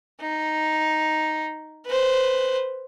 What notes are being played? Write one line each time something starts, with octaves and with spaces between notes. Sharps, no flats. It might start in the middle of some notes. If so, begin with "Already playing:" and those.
D#4
B4 C5